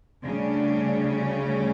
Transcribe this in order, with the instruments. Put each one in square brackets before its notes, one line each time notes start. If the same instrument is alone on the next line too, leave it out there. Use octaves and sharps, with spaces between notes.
[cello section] D2 C#3 G3 C#4 D4